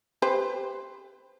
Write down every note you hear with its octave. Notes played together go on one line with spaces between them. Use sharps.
G4 B4 C5